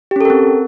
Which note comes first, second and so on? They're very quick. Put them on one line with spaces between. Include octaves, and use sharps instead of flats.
G4 C#4 A4 A#4 C4